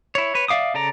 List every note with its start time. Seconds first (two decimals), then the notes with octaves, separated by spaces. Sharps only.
0.15 E4 C#5
0.35 B4 C#5
0.48 D5 E5 F5 D6 D#6
0.74 C#3 A4 D5 A#5